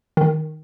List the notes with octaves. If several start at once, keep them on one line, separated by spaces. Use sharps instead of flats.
D#3